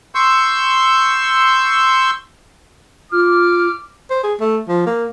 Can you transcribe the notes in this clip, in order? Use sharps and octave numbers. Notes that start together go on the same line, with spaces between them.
C6 C#6 E6 G6
F4 D6 F6
C5
G#4
A3
F3
A#3